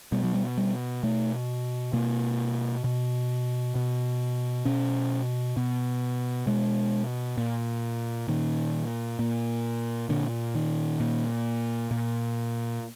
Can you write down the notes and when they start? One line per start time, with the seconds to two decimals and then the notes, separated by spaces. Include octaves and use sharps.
0.12 B2 G3
0.24 F#3
0.34 G3
0.58 G3
1.03 B2 A3
1.93 B2 A#3
2.84 B2
3.75 B2
4.65 B2 C#4
5.57 B2
6.47 B2 G#3
7.38 A#2
8.28 A#2 D#3
9.19 A#2
10.09 A#2 D3
10.55 D#3
11.00 A#2
11.91 A#2